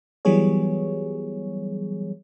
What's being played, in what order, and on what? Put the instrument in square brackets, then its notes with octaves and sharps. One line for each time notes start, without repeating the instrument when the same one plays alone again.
[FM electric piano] E3 F#3 G3 B3 G#4 C#5